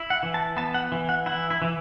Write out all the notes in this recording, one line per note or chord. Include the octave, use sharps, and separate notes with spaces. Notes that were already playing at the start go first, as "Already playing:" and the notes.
Already playing: E4
F#5
E3
A5
B3 A5
F#5
E3
F#5
E4 F#5
E4
E3